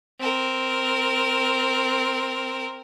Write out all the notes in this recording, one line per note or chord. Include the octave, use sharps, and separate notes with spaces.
C4 A#4